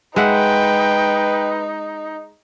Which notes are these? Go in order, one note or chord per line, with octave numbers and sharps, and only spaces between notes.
G#3 D#4 B4 E5 F#5 G5